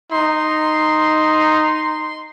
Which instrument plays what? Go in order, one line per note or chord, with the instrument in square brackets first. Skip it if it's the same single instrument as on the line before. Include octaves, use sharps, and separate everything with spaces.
[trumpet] D#4 [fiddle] C6